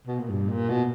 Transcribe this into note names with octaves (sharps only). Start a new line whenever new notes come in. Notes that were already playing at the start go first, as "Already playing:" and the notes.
B2
A#2
G2
A#2
B2